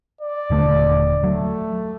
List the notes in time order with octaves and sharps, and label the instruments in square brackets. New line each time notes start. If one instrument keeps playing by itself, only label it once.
[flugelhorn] D5
[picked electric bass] D#1 D3 A3
[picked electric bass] F#3 [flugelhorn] A3